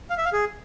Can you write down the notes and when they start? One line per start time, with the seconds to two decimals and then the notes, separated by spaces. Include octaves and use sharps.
0.10 F5
0.18 E5
0.25 F5
0.33 G#4